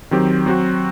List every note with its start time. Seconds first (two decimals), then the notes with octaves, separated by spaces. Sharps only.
0.11 D#3 F#3 C4 G4
0.46 F#3 C4 F#4